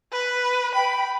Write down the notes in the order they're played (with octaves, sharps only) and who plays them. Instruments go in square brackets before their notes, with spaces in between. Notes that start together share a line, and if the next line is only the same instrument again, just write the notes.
[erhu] B4
[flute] G5 [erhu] B5